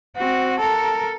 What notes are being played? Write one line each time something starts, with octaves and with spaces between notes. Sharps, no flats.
C4 F#4
A4 A#4